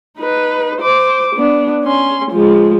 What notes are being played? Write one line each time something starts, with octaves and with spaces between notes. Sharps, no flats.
D#4 B4
C5 D6
B3 D4
C#4 C6
F3 G#3